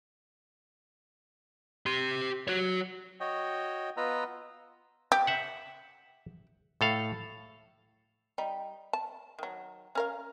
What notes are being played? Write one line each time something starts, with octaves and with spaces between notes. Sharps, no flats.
G4 C6
F#4 C#5
F#4 C#5 D#5 G5
B3 F4 B4 D#5 A#5 E6
G4
E5 F#5
A2 A4 F5
G3 D#4
A5
D#3 F#3
C#4 A#4 F5